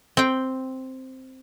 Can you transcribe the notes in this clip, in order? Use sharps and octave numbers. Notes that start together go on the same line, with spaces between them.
C4 G5